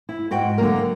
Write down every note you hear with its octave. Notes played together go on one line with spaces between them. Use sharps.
E4
G#2 F#4 G5
D3 F#3 A#3 A#4